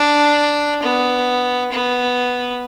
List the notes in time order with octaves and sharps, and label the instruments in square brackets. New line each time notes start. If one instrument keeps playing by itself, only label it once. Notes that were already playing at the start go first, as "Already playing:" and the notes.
Already playing: [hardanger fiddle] D4
B3
B3